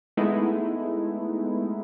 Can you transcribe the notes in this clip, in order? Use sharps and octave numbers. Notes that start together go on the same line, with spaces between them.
G#3 A3 B3 D#4 E4